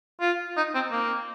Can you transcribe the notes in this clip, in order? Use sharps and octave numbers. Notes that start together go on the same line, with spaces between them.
F4
D#4
C4
A#3